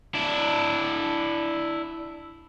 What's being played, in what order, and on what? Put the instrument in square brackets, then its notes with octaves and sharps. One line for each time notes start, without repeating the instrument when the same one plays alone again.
[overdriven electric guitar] D4 E4